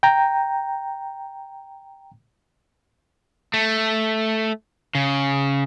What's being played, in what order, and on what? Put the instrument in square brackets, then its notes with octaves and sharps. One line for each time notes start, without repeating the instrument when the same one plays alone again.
[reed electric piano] G5 A#5
[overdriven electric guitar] A3
C#3